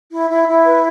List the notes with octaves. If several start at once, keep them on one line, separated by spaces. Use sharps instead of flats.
E4
E4
E4
B4